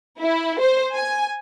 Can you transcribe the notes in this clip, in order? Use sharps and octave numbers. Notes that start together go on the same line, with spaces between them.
E4
C5
G#5